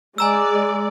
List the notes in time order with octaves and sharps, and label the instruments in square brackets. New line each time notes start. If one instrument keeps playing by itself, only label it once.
[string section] G#3 D5 [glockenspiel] G#5 A#5 E6